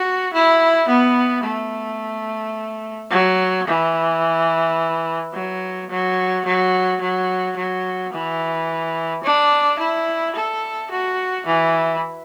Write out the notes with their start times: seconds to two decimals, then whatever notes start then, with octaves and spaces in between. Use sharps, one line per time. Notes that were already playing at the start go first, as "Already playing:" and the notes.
Already playing: F#4
0.33 E4
0.88 B3
1.44 A3
3.11 F#3
3.67 E3
5.33 F#3
5.90 F#3
6.45 F#3
7.01 F#3
7.57 F#3
8.13 E3
9.23 D4
9.79 E4
10.35 A4
10.91 F#4
11.47 E3